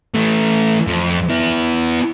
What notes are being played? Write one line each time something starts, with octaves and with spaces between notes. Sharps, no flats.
E3 A3
F2
B3 E4